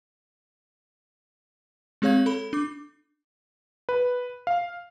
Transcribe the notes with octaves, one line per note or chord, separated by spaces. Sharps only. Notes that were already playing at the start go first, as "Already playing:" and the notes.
G#3 C4 G#4 C#5 F5 G#6
A4 B5
D4 D6
B4
F5